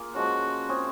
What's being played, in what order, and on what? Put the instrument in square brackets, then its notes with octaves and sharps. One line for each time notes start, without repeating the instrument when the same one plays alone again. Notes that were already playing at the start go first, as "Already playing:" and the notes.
Already playing: [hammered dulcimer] A#3 F4 G#4
[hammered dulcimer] F3 G#3 C#4 [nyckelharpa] F#4
[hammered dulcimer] C4 F4 G#4 C#5